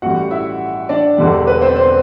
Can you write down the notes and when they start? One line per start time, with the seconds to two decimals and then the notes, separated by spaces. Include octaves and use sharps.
0.02 A1 A2 G3 F#4 F#5
0.31 E4 E5
0.89 D4 D5
1.18 E1 E2 D3 G3
1.47 B4
1.61 C4 C5
1.76 C4 C5